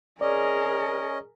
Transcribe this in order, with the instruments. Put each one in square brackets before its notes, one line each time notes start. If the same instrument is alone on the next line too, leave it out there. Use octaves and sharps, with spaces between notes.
[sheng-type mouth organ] C#4 D#5 [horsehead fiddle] G#4 A#4 [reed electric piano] D5